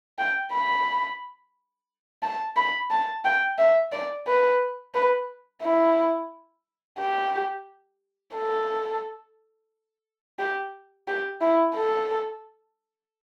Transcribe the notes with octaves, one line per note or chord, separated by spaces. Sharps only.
G5
B5
A5
B5
A5
G5
E5
D5
B4
B4
E4
G4
A4
G4
G4
E4
A4